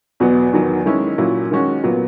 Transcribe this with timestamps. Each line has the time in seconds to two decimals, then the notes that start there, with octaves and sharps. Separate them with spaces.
0.20 E2 B2 F#3 B3
0.53 E2 D#3 F#3 B3
0.86 D#3 G#3 C#4 E4
1.18 A#2 F#3 C#4 E4
1.51 D#3 G#3 C#4 F#4
1.84 A#2 F#3 B3